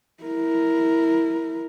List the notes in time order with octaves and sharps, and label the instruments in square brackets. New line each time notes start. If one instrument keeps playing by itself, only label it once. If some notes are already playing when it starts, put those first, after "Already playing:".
[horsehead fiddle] E4 A#4